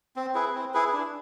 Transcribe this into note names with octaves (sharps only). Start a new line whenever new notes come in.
C4
E4 G#4 B4
C4
E4 G#4 B4
D4